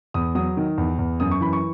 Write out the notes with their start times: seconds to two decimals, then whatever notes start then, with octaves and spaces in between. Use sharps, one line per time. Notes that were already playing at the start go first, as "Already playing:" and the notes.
0.14 E2 D#6
0.35 F#3 D#6
0.57 D#3
0.78 E2
0.99 E2
1.20 F#2 D#6
1.31 C#6
1.41 E3 B5
1.53 C#6